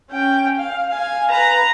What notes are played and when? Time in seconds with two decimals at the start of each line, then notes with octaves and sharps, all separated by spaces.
0.11 C#4 G5
0.58 F5
0.90 F5 G#5
1.31 B4 A#5